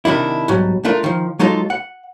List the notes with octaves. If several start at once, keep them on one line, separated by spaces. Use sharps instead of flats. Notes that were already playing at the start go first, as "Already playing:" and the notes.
C3 D#3 F3 D4 E4
B1 G#2 F#3 G3
A3 D4 F4 A#4
D#3 F3
F#3 G#3 D#4 F4 A4
F#5